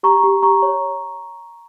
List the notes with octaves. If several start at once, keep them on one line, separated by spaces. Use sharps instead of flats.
G4 A#5 C#6
G4
G4 A#5 C#6
C#5